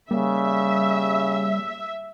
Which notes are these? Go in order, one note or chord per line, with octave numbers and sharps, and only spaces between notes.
C#3 G3 A#3 E5